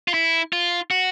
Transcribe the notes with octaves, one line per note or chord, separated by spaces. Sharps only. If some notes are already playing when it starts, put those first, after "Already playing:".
F4
E4
F4
F#4